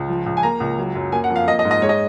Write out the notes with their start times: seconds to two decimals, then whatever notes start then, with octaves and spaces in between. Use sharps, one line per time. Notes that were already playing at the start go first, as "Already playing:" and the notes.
Already playing: C#2
0.08 F3
0.26 C#2
0.37 G#5
0.43 A#3 A#5
0.60 C#2
0.78 F#3
0.95 F#2
1.12 A#3 G#5
1.24 F#5
1.30 F2
1.36 F5
1.48 A#3 D#5
1.59 D#5
1.65 G#2
1.71 D#5
1.82 G#3 C#5
1.89 D#5